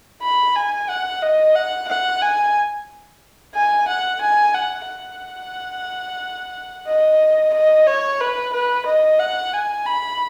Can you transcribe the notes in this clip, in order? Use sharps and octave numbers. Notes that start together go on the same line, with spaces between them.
B5
G#5
F#5
D#5
F#5
F#5
G#5
G#5
F#5
G#5
F#5
F#5
D#5
D#5
C#5
B4
B4
D#5
F#5
G#5
B5